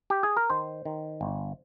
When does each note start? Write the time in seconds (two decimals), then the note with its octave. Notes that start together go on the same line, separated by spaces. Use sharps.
0.10 G4
0.23 G#4
0.37 A#4
0.50 D#3 C5
0.85 D#3
1.21 G1